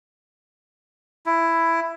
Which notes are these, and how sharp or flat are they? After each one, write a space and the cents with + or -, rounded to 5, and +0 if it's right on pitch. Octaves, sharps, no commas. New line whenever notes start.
E4 +10